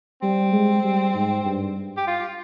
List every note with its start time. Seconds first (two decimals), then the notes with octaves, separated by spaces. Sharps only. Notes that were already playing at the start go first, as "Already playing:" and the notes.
0.22 G3 C4
0.52 G#3
0.84 G3
1.14 G#2
1.45 G2
1.97 G4
2.07 F4